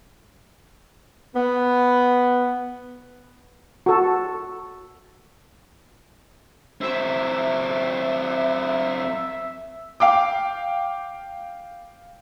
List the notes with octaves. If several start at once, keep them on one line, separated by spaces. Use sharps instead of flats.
B3
F#4 A4
F#3 C4 E5
F5 G5 D6